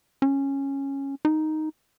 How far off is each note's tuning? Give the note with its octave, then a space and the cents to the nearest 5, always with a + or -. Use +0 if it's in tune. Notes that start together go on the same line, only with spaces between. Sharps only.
C#4 -10
D#4 +0